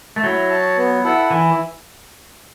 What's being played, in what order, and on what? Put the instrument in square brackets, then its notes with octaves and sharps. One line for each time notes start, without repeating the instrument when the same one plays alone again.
[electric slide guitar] A3
[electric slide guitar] F#3 [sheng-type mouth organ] E4
[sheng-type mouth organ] C#5 A5
B3
E4 A4 F#5
[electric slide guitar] E3 [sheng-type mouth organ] E4